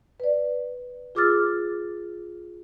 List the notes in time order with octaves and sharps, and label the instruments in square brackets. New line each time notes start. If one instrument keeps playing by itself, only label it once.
[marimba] B4 D5
F4 G#4 D6 E6 F6 A6